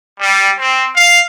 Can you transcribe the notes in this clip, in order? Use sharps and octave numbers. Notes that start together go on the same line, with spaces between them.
G3
C4
F5